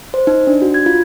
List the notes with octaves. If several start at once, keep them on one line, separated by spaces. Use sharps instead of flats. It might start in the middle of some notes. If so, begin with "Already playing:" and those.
C5
D#4
D4
F#4
G#6
F4